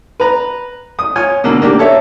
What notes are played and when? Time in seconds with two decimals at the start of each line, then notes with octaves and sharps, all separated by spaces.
0.20 B4 A#5
0.99 D#6
1.16 F4 C#5 G#5
1.44 B2 D3 A#3
1.61 C#3 A#3 D4 G4
1.79 A4 C#5 E5